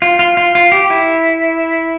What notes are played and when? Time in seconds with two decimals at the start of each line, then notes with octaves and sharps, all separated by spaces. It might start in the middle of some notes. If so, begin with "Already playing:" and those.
0.02 F4
0.19 F4
0.37 F4
0.55 F4
0.72 G4
0.90 E4